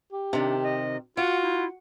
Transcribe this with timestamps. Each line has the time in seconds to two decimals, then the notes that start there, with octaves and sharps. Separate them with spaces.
0.13 G4
0.33 C3 D#3 D4
0.63 D#5
1.17 F4 F#4 F#5
1.42 E4